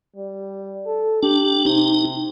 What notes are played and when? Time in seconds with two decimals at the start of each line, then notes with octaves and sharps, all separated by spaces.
0.16 G3
0.86 A4
1.23 D4 G4
1.66 C3 D#4